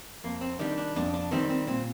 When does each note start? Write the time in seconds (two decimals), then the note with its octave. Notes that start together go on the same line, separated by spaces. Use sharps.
0.24 F2 A#3
0.41 C4
0.59 D#3 G3 D4
0.78 D4
0.96 F2 D4
1.14 D4
1.31 D#3 G3 C4
1.49 C4
1.67 A#2 C4